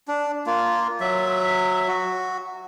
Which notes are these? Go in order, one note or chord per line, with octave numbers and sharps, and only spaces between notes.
D4
A#3 F4
F#3 E5
F#4